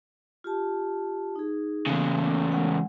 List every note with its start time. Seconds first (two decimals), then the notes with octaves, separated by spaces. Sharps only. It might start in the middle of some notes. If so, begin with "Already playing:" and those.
0.44 F4 G4 A5
1.36 D#4 G#4
1.86 E2 C#3 A#3
2.52 G#3 F#5